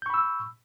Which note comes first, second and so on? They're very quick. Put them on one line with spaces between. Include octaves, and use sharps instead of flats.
G6 C#6 B5 E6